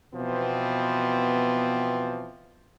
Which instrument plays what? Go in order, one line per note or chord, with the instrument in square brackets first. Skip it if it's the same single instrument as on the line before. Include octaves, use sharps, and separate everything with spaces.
[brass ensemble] B2 E3 F3 B3 C4